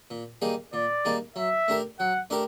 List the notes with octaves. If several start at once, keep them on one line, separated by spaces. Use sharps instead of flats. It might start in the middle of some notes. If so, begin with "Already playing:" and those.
A#2
G3 A#3 D#4 G#4
A#2 D5
G3 A#3 D#4 G#4
F#3 E5
A3 D4 G4 A#4
F#3 F#5
A3 D4 G4 A#4